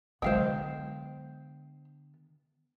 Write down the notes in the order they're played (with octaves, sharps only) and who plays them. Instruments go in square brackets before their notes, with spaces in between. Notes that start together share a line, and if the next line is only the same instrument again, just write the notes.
[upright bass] D3 B3 [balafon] F#3 G#3 [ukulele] C5 F5 G5